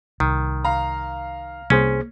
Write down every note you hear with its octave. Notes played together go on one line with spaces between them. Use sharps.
C2 D#3
F5 A#5
C2 A#3 C#4 G#4 C5